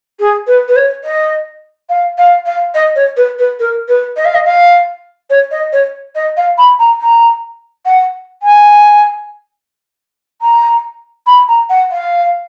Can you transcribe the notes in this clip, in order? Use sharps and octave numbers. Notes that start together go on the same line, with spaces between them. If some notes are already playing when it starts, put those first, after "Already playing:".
G#4
B4
B4
C#5
D#5
F5
F5
F5
D#5
C#5
B4
B4
A#4
B4
D#5
F5
D#5
F5
C#5
D#5
C#5
D#5
F5
B5
A#5
A#5
F#5
G#5
A#5
B5
A#5
F#5
F5